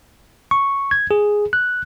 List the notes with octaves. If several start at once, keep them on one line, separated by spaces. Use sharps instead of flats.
C#6
G#6
G#4
F#6